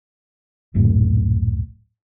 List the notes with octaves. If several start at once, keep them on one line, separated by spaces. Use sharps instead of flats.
D1 A#1 F#2 A2